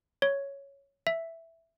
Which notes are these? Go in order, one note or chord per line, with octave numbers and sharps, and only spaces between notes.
C#5
E5